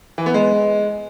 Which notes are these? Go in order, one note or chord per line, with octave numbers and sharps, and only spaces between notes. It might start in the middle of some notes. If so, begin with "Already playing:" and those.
E3
B3
G#3